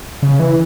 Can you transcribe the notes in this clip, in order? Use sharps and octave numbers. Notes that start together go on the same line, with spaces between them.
C#3
E3